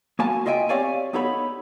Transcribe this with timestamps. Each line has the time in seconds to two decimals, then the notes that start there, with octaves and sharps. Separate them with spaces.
0.19 A#3 F#4 G#5 A5
0.46 F4 D#5 E5 G5 G#5
0.69 C4 G4 C#5 D5 F5 G#5
1.13 B3 D#4 G4 A4 C#5 B5